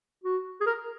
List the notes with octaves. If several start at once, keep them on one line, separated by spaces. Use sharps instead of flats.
F#4
G#4
A#4